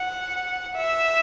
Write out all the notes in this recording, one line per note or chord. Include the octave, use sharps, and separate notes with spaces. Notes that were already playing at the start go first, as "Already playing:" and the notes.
Already playing: F#5
E5